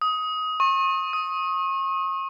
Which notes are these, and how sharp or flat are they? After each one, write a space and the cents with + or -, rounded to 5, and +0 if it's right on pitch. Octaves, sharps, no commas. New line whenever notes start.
D#6 +20
C#6 -40
D#6 +20